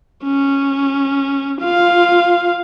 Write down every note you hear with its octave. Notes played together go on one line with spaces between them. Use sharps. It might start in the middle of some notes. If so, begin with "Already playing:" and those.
C#4
F4 F5